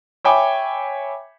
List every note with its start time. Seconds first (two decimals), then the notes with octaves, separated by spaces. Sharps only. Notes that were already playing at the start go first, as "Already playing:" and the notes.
0.25 C#5 E5 G5 G#5 B5 D6